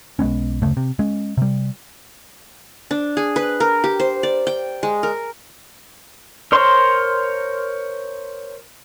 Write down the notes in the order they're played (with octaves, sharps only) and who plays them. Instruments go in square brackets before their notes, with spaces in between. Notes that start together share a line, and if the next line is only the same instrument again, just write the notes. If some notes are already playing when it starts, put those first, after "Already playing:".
[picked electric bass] B1 G#3 B3 C#4
F#1 D2 C#3 A3
C3
G#3 C#4
C3 G3
[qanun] D4
G#4
B4
A#4
G4
C5
D5
G5
G#3
A#4
[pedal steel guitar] A#4 C5 C#5 C6